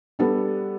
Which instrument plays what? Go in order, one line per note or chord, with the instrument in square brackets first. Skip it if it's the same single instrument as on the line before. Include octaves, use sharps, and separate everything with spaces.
[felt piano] G3 B3 D4 A4